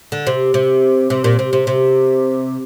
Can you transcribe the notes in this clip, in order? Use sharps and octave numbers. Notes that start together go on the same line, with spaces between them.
D3
C3
C3
C3
A#2
C3
C3
C3